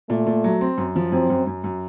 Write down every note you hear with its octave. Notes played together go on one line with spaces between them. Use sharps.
A#2 A3
A#2
F#3
C4
F#2
F3
F#2 C4
F#2
F#2
F#2